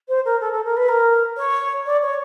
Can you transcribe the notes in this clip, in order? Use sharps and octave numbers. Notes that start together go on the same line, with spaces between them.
C5
A#4
A4
A4
A#4
B4
A#4
C#5
D5
C#5